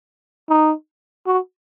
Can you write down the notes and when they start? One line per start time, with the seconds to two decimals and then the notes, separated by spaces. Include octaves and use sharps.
0.49 D#4
1.26 F#4